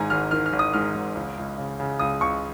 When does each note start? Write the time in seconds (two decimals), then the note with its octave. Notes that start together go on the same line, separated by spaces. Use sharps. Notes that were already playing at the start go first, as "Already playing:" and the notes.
Already playing: G#1 G#2 D#3 G#5 A#5
0.10 G#1 F6
0.31 D#3 F6
0.46 F6
0.53 G#1
0.59 D#6
0.73 G#2 F6
0.95 G#1
1.15 C#2
1.38 C#2
1.58 C#3
1.80 C#3
2.00 C#2 D#6
2.21 C#2 C#6